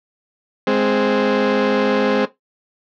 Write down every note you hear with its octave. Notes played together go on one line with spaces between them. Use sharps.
G#3 C4